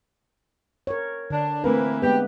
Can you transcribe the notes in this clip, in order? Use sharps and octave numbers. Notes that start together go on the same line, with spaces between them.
A#4 C#5
D3 D4
E3 A3 A#3 C4 B4
G#3 B3 G4 B4